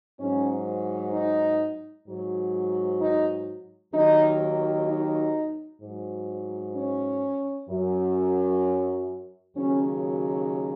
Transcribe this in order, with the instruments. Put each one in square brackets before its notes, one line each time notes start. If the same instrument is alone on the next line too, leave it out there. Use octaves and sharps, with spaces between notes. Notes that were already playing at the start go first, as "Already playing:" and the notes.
[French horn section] G#2 F#3 C#4
D#4
G#2 F#3
D#4
D#2 D#3 F#3 D#4
D#4
G#2 F#3
C#4
F#2 F#3
D#2 C#3 F#3 C#4